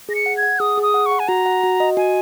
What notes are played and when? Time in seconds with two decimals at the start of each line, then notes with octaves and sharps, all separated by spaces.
0.09 G#4 A#6
0.15 C#7
0.26 F#5
0.37 G#6
0.43 F#5
0.60 G#4 D#6
0.77 G#4
0.83 D#6
0.94 F#5
1.06 C#6
1.11 F#5
1.20 G#5
1.28 F#4 A#5
1.46 F#5
1.63 F#4
1.80 D#5
1.97 F#4 G#5